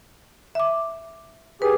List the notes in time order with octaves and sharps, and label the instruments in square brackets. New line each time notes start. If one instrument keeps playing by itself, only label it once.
[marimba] E5 D6
[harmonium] G4 G#4 [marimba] B4